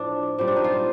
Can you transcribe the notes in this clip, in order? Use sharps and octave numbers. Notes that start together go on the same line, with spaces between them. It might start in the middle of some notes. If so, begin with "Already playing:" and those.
Already playing: A2 F3 D4
A#2 G3 C4
D4
D#4
F4